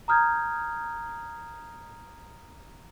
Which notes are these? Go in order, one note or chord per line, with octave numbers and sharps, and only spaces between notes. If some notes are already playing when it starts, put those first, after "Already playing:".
A#5 D#6 F6 G6 G#6